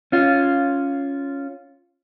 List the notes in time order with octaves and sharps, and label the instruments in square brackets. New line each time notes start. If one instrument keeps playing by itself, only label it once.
[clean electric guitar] C#4 F4